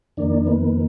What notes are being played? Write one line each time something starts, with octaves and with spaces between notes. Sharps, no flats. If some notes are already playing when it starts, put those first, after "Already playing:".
F2 D#3 A#3 D4
B3